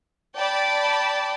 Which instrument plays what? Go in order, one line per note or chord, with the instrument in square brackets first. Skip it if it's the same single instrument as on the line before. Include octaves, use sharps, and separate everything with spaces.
[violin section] D5 G5 A5 B5